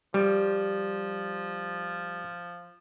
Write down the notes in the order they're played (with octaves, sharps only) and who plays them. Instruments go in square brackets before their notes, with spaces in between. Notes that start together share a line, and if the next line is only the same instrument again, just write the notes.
[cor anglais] F3 [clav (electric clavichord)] G3